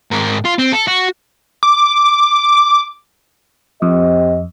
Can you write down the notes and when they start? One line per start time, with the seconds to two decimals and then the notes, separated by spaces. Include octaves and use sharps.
0.11 G#2 A#4
0.45 F4
0.59 C4
0.73 A4
0.88 F#4
1.63 D6
3.82 F2 C4 G4 D#5